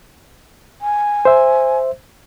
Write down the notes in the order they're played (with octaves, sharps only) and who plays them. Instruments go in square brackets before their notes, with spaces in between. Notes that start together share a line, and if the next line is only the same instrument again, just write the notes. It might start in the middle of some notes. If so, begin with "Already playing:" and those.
[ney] G#5
[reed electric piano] C5 E5